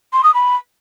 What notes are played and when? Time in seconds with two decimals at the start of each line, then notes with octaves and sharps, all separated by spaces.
0.13 C6
0.23 D#6
0.34 B5